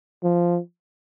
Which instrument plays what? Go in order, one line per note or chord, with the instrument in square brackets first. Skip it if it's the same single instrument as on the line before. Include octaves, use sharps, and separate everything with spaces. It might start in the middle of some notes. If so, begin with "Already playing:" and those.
[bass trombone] F3